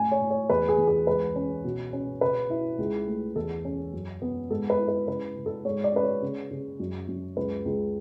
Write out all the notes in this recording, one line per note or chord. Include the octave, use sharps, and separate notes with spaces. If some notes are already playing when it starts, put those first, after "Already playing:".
Already playing: A2 C#4 G#5
C#5
A2
C#5
E2 B4
G#4
E2
G#4
C#2 B4
C#4
B2
C#4
C#3 B4
E4
C#2
A3
E2 A4
C#4
F#2
B3
G#2 A4
B4
E4
B4
C#3 B4
C#3
A4
G#2 C#5
D5
C#4 B4
C#5
C#3
C#3
F#2
F#2
C#2 B4
C#2